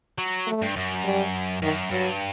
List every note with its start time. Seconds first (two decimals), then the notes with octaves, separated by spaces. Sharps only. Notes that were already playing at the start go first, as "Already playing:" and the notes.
0.18 F#3
0.47 A3
0.62 G2
0.76 F#2
1.04 G3
1.62 F#2 D#3
1.91 G2 F#3